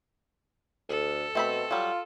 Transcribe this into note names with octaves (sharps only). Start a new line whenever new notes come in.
D2 A4
B2 A3 C4 B5
F#3 G3 F4